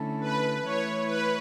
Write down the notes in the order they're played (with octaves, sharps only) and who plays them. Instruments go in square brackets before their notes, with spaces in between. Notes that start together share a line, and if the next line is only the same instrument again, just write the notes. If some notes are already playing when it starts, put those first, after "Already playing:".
Already playing: [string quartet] D3 A3 C#4 E4 A4
[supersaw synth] B4
[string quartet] E3 A3 E4 [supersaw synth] C#5
[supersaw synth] B4